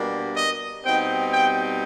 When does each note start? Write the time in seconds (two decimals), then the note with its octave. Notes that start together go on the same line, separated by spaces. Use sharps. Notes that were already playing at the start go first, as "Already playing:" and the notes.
Already playing: B2 G3 A#3 D4
0.36 D#5
0.84 B2 G3 C4 D#4 G5
1.32 G5